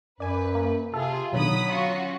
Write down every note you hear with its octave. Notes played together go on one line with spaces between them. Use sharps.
F#2 B4 D5 G#5
A#3
C3 F4 G#4 A4
B2 D3 D#3 F#3 B5 D#6
C#4 F4 F#4